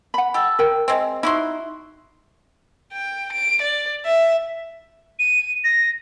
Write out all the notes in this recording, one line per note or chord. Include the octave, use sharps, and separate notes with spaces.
F#5 B5
G4 A4
A#4 G5
G#3 C4
D#4 E4 F#4 C6
G5
D7
D5
E5
D#7
A#6